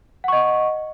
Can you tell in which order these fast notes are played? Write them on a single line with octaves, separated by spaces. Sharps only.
F#5 C#6 D#5